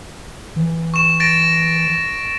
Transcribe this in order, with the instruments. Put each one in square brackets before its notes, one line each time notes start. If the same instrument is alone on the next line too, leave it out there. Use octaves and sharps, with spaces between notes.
[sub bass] E3
[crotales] C#6 E7
A6 A#6 D7